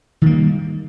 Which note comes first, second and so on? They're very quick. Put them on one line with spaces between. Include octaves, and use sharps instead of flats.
D#3 A#3 G3